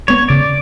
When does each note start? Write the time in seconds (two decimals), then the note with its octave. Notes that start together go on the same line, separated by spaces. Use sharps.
0.08 G#3 B3 C#5
0.28 C#3 D5